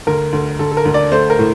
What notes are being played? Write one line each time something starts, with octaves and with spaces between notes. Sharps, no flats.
D2 A#4
D2
D2 A4
A4
A#4
D2
D5
A3 C5
A#4
A2